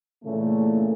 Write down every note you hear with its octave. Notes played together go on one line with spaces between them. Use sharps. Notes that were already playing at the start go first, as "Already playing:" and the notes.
A#2 C#3 E3 A3